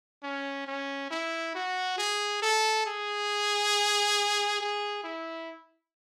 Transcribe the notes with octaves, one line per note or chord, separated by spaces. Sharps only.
C#4
C#4
E4
F#4
G#4
A4
G#4
G#4
E4